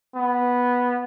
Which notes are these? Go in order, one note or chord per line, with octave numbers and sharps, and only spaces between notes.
B3